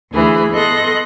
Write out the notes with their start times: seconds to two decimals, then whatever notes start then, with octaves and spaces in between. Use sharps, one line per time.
0.12 D2 E3 G#4 B5
0.52 B3 A4 D#5 C6 F#6 A#6